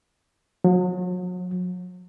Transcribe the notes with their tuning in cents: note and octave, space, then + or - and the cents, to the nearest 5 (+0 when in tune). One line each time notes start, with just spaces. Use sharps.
F#3 -40